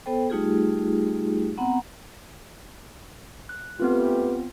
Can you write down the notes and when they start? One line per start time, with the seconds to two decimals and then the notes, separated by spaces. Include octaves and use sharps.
0.06 B3 A4 C5 G5
0.30 G3 A3 D#4 F4 G4 G#4
1.58 B3 C4 F#5 A#5
3.49 F#6
3.80 A3 B3 C4 F4 G4 B4